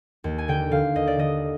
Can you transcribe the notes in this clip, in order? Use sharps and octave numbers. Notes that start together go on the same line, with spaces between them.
D#2
G#5
D3 G5
D3 F5
D#2 D#5
D5
D3 D#5